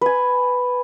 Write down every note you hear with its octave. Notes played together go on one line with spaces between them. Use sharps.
B4 G#5